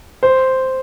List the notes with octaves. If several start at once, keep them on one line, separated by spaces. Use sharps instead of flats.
C5